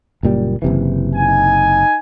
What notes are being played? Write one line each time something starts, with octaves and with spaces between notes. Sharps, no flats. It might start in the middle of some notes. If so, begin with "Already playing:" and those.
F#1 A#2 G3
F#1 C3 E3
D#4 G#5